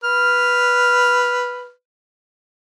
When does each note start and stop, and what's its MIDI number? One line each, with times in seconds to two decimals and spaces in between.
0.04 1.70 71
0.04 1.70 89